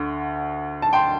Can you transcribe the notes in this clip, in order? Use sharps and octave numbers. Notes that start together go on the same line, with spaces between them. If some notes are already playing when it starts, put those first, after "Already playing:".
Already playing: D2 D3
A5
G5 C6